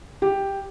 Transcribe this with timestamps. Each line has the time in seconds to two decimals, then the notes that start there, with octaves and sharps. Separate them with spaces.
0.22 G4